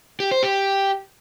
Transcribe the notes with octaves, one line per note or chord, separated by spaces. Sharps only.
G4
C5
G4